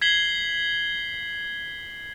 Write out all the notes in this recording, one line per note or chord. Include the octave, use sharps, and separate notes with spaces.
G#6 B6 C7 F#7 G7